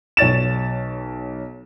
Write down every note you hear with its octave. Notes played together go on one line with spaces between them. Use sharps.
B1 C#5 A6 E7